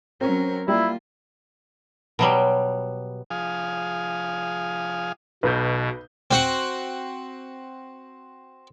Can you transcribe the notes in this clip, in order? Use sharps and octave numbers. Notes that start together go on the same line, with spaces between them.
F#3 C4 C#4 A#4
G3 A#3 E4 F4
B2 F#3 G3
F3 G#4 F5 G#5 D#6
B1 B2 B4 G6
C4 F#4 F#5